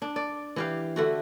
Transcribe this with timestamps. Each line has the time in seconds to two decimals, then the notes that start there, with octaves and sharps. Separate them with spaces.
0.02 D4
0.16 D5
0.56 E3 G4 F5
0.96 D3 A3 F#4